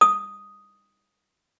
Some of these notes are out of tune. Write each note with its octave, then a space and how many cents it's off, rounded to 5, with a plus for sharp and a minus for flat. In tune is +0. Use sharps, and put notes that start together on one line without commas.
D#6 +5